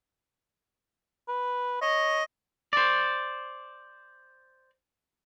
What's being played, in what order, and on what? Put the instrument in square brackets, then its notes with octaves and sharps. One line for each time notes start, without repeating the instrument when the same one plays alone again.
[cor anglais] B4
[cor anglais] C#5 [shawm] D#5
[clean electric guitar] C5 D5